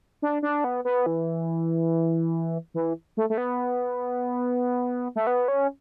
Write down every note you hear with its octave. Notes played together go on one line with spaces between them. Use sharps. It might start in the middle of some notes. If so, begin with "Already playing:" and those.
D4
D4
B3
B3
E3
E3
A3
A3
B3
A3
B3
C#4